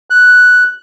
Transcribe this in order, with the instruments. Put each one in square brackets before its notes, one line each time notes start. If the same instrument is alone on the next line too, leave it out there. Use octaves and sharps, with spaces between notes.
[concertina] F#6